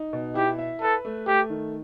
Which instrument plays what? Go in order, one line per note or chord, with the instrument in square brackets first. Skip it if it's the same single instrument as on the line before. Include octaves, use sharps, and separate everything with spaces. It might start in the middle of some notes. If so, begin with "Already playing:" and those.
Already playing: [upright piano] D#4
B2
[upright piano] E4 [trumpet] G4
[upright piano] E5
[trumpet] A4 [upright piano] B4
[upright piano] A3
[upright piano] A3 [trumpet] G4
[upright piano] D#3